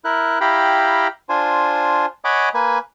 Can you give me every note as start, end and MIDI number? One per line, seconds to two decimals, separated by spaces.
0.05 0.39 64
0.05 0.39 70
0.05 0.39 90
0.41 1.08 64
0.41 1.08 67
0.41 1.08 77
0.41 1.08 79
0.41 1.08 82
0.41 1.08 83
1.29 2.06 62
1.29 2.06 65
1.29 2.06 72
1.29 2.06 80
2.24 2.49 73
2.24 2.49 75
2.24 2.49 78
2.24 2.49 80
2.24 2.49 83
2.24 2.49 86
2.54 2.79 58
2.54 2.79 71
2.54 2.79 80